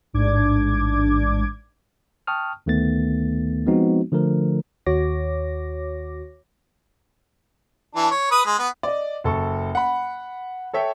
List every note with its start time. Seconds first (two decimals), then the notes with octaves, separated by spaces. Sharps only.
0.13 A1 G#2 D4 D6 G#6
2.27 G5 A5 C#6 D#6 F6
2.66 D2 D#3 A3 B3 A6
3.66 F3 G#3 B3 C4 D#4 F#4
4.12 D3 F3 A3 A#4
4.86 D#2 F#4 C#5 D6 A#6
7.96 E3 D4
8.11 C#5
8.31 B4 D#6
8.46 G#3
8.59 B3
8.83 D5 D#5
9.24 F#1 A4 C#6
9.75 F#5 B5
10.73 A4 C#5 E5 G5